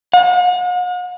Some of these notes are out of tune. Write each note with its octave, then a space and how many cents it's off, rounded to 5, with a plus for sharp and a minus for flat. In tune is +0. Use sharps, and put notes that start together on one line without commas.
F#5 -45